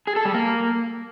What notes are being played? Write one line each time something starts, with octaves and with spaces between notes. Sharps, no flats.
G#4
A4
G3
A#3